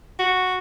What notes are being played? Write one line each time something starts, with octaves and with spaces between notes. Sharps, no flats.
F#4